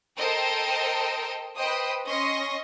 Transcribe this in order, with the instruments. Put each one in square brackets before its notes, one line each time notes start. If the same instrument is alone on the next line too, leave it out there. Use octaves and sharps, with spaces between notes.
[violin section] A4 A#4 C5 D#5 G5 A5
B4 C5 D#5 G5 D#6
C#4 D#5 C6 C#6 A#6